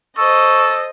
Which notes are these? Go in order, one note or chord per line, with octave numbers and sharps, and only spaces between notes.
A4 C5 D#5 C#6